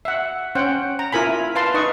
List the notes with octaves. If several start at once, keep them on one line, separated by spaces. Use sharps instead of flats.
E5 F#5
C#4 C5 F#5 G5
A#5
E4 F4 A#4 G#5 B5
B4 F5 A5 C6
D#4 B4 D#5 C#6